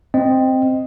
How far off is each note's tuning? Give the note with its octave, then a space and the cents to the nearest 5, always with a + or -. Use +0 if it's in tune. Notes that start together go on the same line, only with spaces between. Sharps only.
C4 +0 D#5 +0